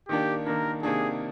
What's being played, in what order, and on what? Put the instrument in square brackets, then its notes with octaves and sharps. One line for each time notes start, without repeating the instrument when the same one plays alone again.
[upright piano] D#3 A#3 D4 [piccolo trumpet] G4
[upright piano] D#3 A#3 D4 [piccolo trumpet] A#4
[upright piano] C3 D#3 A#3 D4 [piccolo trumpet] G#4